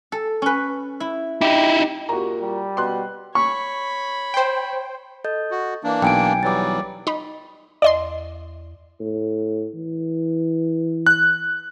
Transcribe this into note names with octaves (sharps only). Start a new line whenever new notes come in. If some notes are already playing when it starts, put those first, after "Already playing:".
A4
C#4 B4
E4
D#4 E4 G4
A#2 F#4 G4 A#5
G3
B2 C6 F#6
C#5 B5 C#6
C5 G5
A4 D#5 G6
F#4
E3 A#3 D4
B1 G5 G#5 D7
G5
E3 F#3 G3 D6 A6
D#4 B5
E2 D5 D#5 C6
A2
E3
F#6